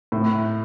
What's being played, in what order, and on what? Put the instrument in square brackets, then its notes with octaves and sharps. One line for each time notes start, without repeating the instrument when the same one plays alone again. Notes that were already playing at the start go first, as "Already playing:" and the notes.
[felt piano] A2